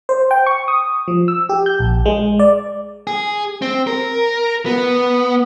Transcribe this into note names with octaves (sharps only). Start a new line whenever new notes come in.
C5
G5
C#6
D#6
F3
E6
G4
G6
A#1
G#3
D5
G#4
C4
A#4
B3